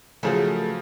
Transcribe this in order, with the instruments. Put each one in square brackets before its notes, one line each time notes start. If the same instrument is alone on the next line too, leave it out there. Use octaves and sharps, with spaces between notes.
[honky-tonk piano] C#3 F3 F#3 [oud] A3 G#4 A#4